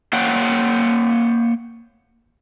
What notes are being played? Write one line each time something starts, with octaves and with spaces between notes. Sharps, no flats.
A#3 C5 C#5 F#5 G5